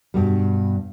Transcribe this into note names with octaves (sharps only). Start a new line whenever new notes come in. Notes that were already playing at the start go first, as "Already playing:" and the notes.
G2 B2 G3